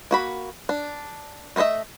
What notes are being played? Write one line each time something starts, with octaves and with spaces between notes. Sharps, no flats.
A#3 F#4 B5
D4
A3 A#4 C5 D#5 E5